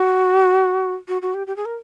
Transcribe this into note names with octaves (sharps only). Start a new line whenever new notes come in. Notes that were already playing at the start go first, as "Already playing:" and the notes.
Already playing: F#4
F#4
F#4
G4
G4
G#4
A#4